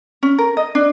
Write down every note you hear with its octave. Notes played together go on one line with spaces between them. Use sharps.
C#4
A#4
D#5
D4